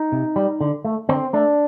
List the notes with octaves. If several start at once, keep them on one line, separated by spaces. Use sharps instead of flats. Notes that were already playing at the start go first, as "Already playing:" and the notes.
Already playing: D#4
C3
G3
D3
A3
D3 C4
A3 D4